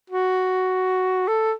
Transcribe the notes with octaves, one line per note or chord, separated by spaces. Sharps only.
F#4
A4